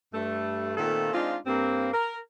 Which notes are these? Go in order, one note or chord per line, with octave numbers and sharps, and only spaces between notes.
G2 A3
A#2 D#3 A3 C4 F4 A4
G#3 C4 D4 D#4 F4
G2 A#3 C4
A#4